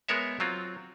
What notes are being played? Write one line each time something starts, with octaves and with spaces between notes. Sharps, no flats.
G#3 B3 A#4 C#5 E5
F#3 C4 F4